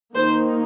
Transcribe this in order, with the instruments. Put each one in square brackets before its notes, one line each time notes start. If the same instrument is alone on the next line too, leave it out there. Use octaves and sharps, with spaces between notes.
[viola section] D#3 A#3 D#4 C5